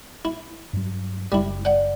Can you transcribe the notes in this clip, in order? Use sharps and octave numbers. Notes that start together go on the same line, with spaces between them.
E4
G2 F#3
F#1 G3 E4
D5 F#5 G5